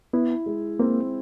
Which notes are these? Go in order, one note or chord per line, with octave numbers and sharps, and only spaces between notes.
B3 E4
G#3
A#3 C4